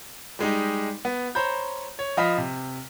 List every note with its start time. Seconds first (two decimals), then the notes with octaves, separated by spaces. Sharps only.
0.39 G3 G#3 D#4 G4
1.05 B3
1.35 C5 C#5 A#5 B5 G6
1.99 C#5
2.17 F3 D#5 F5 B5 F6 B6
2.38 C3